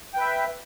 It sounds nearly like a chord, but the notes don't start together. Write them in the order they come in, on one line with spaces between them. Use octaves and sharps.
G5 B4 E5